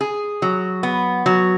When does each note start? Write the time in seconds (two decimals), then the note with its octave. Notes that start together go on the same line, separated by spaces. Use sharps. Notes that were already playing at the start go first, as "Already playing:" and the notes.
0.01 G#4
0.42 F#3
0.83 B3
1.26 F#3